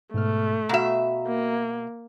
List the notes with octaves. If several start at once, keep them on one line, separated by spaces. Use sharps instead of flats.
G#2 B2 A3 F6
B2 F#4 E5 F5 A#5
A#3